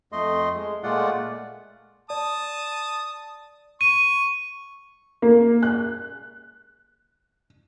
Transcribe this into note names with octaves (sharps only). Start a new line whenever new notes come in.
F2 A3 D#5 C6
G#3
A#2 G#3 A3 F4 D5 F#5
D5 A5 D#6
C#6 D#7
A#3
F#6